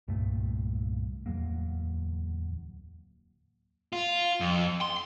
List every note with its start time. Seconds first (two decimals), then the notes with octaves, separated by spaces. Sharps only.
0.08 C2 G2 A#2 A3
1.26 D1 E2 F#3 A#3
3.93 F4
4.40 F2
4.81 C6